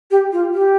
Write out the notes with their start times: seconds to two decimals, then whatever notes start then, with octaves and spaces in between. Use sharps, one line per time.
0.11 G4
0.33 F4
0.54 G4